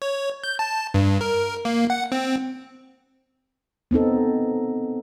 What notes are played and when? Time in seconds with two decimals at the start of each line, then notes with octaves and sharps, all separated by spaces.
0.02 C#5
0.44 G6
0.59 A5
0.94 G2
1.21 A#4
1.65 A#3
1.90 F#5
2.12 C4
3.91 B3 C4 D#4 A4